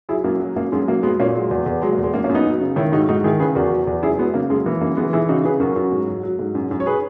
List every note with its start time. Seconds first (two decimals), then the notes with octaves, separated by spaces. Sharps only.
0.09 F#3 E4 G#4
0.24 F#2 A#3
0.40 F#3
0.56 F#2 A#3
0.72 F#2 G#3
0.87 F#3 A#3
1.03 F#3 G#3 B3
1.19 A#2 A#3 C#4
1.35 F#3 G#3
1.51 E2
1.66 E2
1.82 F#3 G#3
1.92 A#3
1.98 E2
2.03 G#3
2.14 F#2 A#3
2.24 A#3 C#4
2.29 F#2
2.35 B3 D#4
2.45 F#3
2.61 C#3
2.76 D#3 C#4 E4
2.92 G#2 D#4 F#4
3.01 E4
3.09 G#2 D#4 F#4
3.24 D#3 E4 G#4
3.40 C#3 G#4 B4
3.55 E2 F#4 A#4
3.71 F#3
3.87 E2
4.03 F#2 E4 G#4
4.18 F#3 G#3 B3
4.34 C#3 A#3
4.50 F#2 G#3
4.66 E3 A#3
4.81 F#2 A#3
4.97 E3 G#3 B3
5.13 E3 E4 G#4
5.28 C#3 D#4 F#4
5.44 C#3 G#4 B4
5.60 F#2 F#4 A#4
5.76 F#2
5.92 G#2
6.08 F#3
6.23 F#3
6.39 G#2
6.55 F#2
6.71 F#2
6.80 C#5
6.86 G#4 B4